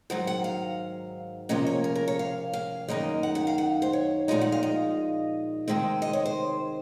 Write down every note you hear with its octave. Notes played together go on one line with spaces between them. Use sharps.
G#2 D#3 F#3 F#5
F#5
F5
C3 F3 A#3 C#4 D#5
C#5
A#4
A#4
C#5
F5
F5
F#2 D#3 A#3 D#4 D#5
F#5
F#5
F5
F#5
C5
C#5
A#2 F3 G#3 D#4 G#5
F#5
F5
D#5
C3 D#3 G#3 C4
D#5
C#5
C5